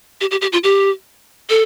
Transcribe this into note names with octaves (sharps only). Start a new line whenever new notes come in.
G4
G4
G4
F4
G4
A4